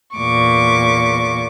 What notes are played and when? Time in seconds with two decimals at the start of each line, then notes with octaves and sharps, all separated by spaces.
0.17 E2 A#2 C#6 D6